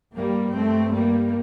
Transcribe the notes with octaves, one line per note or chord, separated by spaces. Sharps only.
G2 G3 A#3
A3 C4
G3 A#3